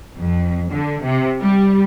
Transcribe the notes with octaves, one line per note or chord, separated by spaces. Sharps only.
F2
D3
C3
G3